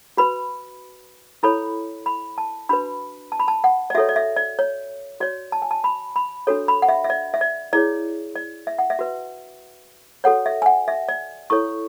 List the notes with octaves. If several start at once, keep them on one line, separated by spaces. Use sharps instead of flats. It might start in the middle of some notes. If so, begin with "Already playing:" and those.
F#4 B4 B5
E4 A4 C#5 B5
B5
A5
D4 F#4 B4 B5
A5
B5
A5
F#5
D5
F#4 A4 C#5 E5
D5
E5
D5
C#5
F#4 C#5 D5
A5
G#5
A5
B5
B5
D4 F#4 A4 C#5
B5
F#5
E5
E5
D5
E5
D5
E4 G#4 C#5 D5
D5
E5
F#5
E5
F#4 B4
F#4 A4 C#5 F#5
E5
G#5
F#5
E5
D5
E4 A4 C#5 C#6